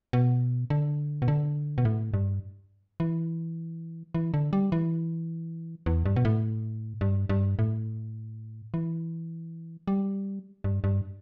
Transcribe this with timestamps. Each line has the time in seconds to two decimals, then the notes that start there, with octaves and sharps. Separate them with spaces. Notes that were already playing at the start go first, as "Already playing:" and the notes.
0.13 B2
0.70 D3
1.22 B2
1.28 D3
1.78 B2
1.85 A2
2.14 G2
3.00 E3
4.15 E3
4.34 D3
4.53 G3
4.72 E3
5.86 E2
6.06 G2
6.16 B2
6.25 A2
7.01 G2
7.29 G2
7.59 A2
8.74 E3
9.88 G3
10.64 G2
10.84 G2